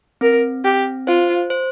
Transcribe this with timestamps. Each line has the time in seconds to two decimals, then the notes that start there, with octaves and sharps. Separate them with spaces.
0.21 C4 A#4
0.64 C4 G4
1.07 F4 C5
1.50 C5